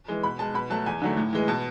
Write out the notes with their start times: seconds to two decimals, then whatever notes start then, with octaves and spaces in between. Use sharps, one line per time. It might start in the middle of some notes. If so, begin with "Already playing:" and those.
0.08 E3 G#3
0.23 B2 B5
0.39 G#3 A5
0.54 B2 B5
0.70 F#3 A3 A5
0.86 E2 G#5
1.02 D3 F#3 A3
1.17 A2
1.33 E3 G#3
1.48 B2 A5